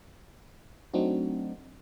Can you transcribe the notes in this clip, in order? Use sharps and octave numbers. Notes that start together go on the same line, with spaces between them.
F#3 A3 C4 D4 D#4 F#4